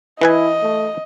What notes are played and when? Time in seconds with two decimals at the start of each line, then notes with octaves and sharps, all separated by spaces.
0.21 E3 E4 B4 D#5 G#5
0.62 A3